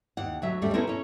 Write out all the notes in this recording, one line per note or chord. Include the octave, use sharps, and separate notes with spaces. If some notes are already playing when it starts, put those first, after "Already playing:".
D#2 F#5
D2 F#3 E5
D#2 G3 A3 C#4
B3 C#4 E4 A4 A#4 C5
C#4 C#5